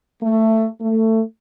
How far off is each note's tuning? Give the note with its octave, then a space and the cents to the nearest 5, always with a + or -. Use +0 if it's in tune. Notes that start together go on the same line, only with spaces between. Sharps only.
A3 +15
A3 +20